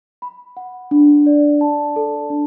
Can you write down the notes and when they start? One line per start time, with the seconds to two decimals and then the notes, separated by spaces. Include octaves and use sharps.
0.22 B5
0.57 F#5
0.91 D4
1.26 D5
1.61 A5
1.96 A4
2.30 D4